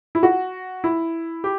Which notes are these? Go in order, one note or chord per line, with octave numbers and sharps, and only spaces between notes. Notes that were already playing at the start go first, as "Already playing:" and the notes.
E4
F#4
E4
G4